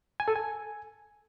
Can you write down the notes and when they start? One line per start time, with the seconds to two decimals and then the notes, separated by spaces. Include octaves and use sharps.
0.20 G#5
0.28 A4
0.36 G#5